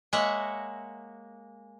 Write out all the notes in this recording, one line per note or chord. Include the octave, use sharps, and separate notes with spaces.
G#3 A#3 C#5 E5 F#5